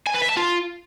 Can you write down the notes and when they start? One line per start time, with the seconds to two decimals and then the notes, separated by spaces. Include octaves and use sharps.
0.07 G#5
0.14 B4
0.22 E5
0.29 A5
0.37 F4